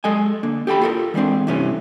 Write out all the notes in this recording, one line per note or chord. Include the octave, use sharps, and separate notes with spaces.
G#3 A4 D#5 G#5
D3 A#3
G4 A4 G5 B5
F4 A4 A#4
E3 G3 G#3 C4 D4
G2 C3 E3 A3 C#4